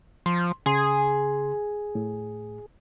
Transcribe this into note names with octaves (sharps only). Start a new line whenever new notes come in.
F3 C6
C#3 G#4 G#5 C6
A2